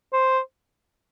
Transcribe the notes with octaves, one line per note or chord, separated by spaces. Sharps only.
C5